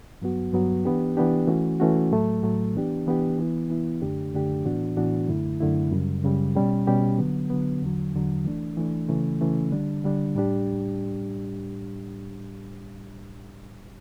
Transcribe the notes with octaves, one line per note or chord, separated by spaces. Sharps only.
G2 F#3 B3 F#4
G2 F#3 B3 F#4
E3 B3 D4 G4
E3 B3 D4 G4
E3 A3 C#4 F#4
E3 A3 C#4 F#4
A2 F#3 A3
A2 F#3 A3
E3 B3 D4 G4
E3 B3 D4 G4
E3 B3 E4
E3 B3 E4
F#2 D3 A3 D4 G4
F#2 D3 A3 D4 G4
A2 E3 B3 D4 F#4
A2 E3 B3 D4 F#4
F#2 D3 A3 E4
F#2 D3 A3 E4
F#2 C#3 G3
F#2 C#3 G3
B2 G3 C#4 G4
B2 G3 C#4 G4
D3 F#3 B3
D3 F#3 B3
E2 D3 F#3
E2 D3 F#3
E3 A3 D4
E3 A3 D4
C#3 E3 A3 C#4
C#3 E3 A3 C#4
D3 G3 D4
D3 G3 D4
A2 G3 D4 G4